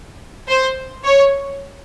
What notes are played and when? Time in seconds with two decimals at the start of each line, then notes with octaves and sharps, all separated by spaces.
0.47 C5
1.04 C#5